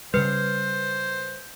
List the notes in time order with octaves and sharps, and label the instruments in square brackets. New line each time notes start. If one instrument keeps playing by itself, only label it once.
[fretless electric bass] C#3 G3 [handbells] B4 F6 C7 [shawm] C5